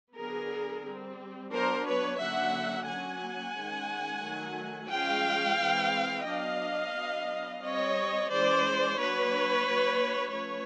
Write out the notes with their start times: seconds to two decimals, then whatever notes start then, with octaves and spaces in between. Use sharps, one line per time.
0.16 D3 F#3 B3 G#4 A#4
0.84 G3 C4
1.51 F#3 B3 D4 A#4 C5
1.85 B4 C#5
2.19 D3 F#3 A#3 C#4 E5 F#5
2.87 F#3 A#3 C#4 F#5 G#5
3.55 D#3 G#3 C#4
4.23 D#3 F#3 A3
4.90 F3 G#3 C#4 F5 G5
5.59 E3 G#3 C4
6.26 F#3 B3 D4 D#5 F5
6.94 F#3 B3 D4
7.61 G3 C4 C#5 D#5
8.29 E3 G#3 C#4 C5 D5
8.97 F#3 A#3 D4 B4 C#5
9.65 F#3 A#3 D4
10.32 F3 A3 C#4 B4 C#5